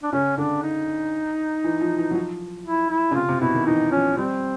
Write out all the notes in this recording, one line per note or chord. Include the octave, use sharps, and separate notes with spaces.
D4
C#3 C#4
D3 D4
D#4
E3
F3
E3
F#3
F3
E4
E4
C#3
C3 F4
C3
B2 E4
D#3
E3 D#4
F3 C#4
G3 C4